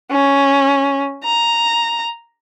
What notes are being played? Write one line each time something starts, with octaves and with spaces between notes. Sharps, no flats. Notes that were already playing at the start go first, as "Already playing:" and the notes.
C#4
A#5